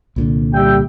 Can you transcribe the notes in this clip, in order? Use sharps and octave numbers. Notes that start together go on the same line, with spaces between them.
C2 A#2 D3
G3 E5 G5